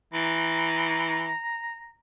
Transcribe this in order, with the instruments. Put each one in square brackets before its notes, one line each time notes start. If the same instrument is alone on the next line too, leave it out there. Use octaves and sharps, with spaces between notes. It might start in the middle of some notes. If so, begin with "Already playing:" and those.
[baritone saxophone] E3 [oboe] A#5